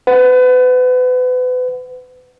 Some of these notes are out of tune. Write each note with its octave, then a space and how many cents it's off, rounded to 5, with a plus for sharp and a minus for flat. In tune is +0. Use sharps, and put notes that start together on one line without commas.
B4 +35 F#5 +0